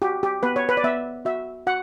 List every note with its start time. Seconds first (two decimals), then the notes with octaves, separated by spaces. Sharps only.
0.02 F#4 G4
0.23 G4
0.43 B3 B4
0.56 C#5
0.69 B4
0.77 D5
0.84 B3 E5
1.25 F#4 E5
1.67 F#4 F#5